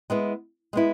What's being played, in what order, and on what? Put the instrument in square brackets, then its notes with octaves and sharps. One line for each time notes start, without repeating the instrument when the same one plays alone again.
[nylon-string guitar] G#3 B3 E4
G#3 B3 E4